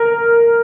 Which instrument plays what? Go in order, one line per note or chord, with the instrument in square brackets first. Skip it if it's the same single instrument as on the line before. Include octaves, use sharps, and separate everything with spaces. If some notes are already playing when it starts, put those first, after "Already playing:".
Already playing: [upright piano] A#4